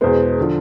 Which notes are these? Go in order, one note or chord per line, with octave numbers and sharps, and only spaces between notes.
E2 B2 G#3 B3 C5
D3 F3